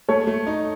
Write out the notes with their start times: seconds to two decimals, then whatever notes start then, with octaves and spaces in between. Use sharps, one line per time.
0.08 A3 A4 C#5
0.27 A3
0.47 D#4